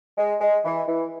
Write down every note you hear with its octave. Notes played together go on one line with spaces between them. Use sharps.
G#3
G#3
E3
E3